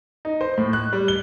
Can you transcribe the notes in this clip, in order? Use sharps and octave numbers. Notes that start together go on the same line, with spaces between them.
D#4
C5
A2
F#6
G3
G7